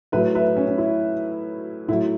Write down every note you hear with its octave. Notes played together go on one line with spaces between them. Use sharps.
A2 F#3 B4 E5
B4 E5
C#4
C#4
E4
A2 F#3 E4